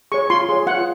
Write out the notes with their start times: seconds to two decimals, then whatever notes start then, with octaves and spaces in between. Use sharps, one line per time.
0.12 G#4 C#5 C#6
0.30 F4 C6
0.49 G#4 C#5
0.67 F4 F#5